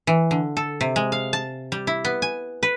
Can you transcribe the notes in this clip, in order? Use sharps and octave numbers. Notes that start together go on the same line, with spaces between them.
E3
D3
A4
C3
G#3
F5
A5
G3
E4
B3
G#5
B4